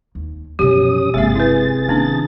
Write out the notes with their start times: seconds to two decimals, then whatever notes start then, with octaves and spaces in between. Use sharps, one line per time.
0.15 D#2
0.59 F#2 B2 F3 C#4 G4 D#6
1.14 G1 C3 G#3 A#3 G#4 E5 A6
1.35 E4 B4
1.88 D#3 A#3 C#4 D4